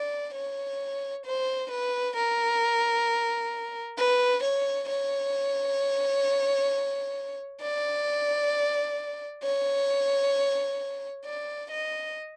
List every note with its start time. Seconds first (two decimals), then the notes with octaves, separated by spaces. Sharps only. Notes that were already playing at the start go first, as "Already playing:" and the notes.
Already playing: D5
0.34 C#5
1.26 C5
1.71 B4
2.16 A#4
3.98 B4
4.43 C#5
4.89 C#5
7.62 D5
9.44 C#5
11.25 D5
11.71 D#5